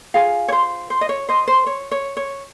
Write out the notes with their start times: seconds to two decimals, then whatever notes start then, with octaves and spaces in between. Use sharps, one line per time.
0.14 F4 G#4 F5 G#5
0.48 C#5
0.52 C5
0.90 C5
1.01 D#5
1.09 C#5
1.29 C5 D#5
1.48 C5
1.66 C#5
1.91 C#5
2.17 C#5